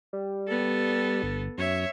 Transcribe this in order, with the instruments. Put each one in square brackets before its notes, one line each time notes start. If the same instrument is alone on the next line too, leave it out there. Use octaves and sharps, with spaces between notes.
[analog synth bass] G3
[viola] B3 A4
[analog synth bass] G1
[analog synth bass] F#2 [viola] C#5 E5